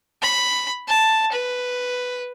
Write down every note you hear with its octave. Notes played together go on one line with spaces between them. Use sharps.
B5
A5
B4